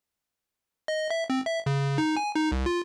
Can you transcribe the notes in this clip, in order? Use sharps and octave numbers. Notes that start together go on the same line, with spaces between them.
D#5
E5
C4
E5
C#3
D#4
G#5
D#4
C2
F4